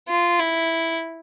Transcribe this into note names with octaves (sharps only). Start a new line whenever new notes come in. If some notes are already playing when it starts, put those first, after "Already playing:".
F4
E4